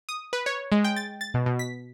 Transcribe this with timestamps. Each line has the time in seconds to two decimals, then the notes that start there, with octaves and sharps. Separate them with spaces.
0.09 D#6
0.33 B4
0.46 C#5
0.72 G#3
0.84 G5
0.96 A6
1.21 A6
1.34 B2
1.46 B2
1.59 B6